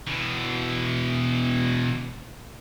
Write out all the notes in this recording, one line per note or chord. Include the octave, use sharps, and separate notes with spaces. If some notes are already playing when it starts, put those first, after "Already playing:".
B2 E3